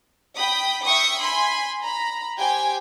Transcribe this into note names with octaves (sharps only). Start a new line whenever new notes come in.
G5 B5 D#6
E5 G5 C#6 D#6
G#5 B5 C6
A#5 B5
G4 C5 G5 G#5